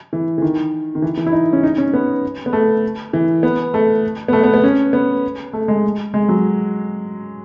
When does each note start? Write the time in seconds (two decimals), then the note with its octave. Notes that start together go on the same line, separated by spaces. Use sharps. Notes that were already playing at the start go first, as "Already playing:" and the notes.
0.13 E3
0.38 E3
0.42 D#3
0.95 D#3
1.02 E3
1.17 E3
1.27 E4
1.32 D#4
1.53 C#4
1.63 D#4
1.78 C#4
1.94 B3
2.46 B3
2.53 A3
3.13 E3
3.43 B3
3.74 A3
4.28 B3
4.33 A3
4.44 B3
4.54 B3
4.64 C#4
4.93 B3
5.53 A3
5.68 G#3
6.14 G#3
6.29 F#3